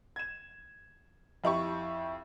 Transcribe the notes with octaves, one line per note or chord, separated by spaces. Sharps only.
G#6 E7
F2 E4 G4 C#6